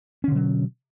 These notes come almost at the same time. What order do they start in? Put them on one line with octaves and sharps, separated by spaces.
C#4 D3 B2 F#3